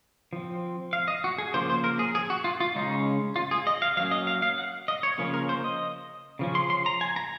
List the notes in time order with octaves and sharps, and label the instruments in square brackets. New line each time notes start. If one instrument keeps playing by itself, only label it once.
[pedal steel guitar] F3 C4
F5
D#5
F#4
G#4
C#3 F3 A#3 C5
C5
A#4
G#4
G#4
F#4
F4
F4
C#3 G#3 C#4 D#4
F4
G#4
D#5
F5
F#3 A#3 C#4 F5
D#5
F5
F5
F#5
D#5
C#5
C#3 F3 A#3 C#4
A#4
C5
D#5
C#3 F3 C#4
C6
C6
A#5
G#5
A#5